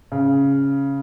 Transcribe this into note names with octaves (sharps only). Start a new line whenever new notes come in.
C#3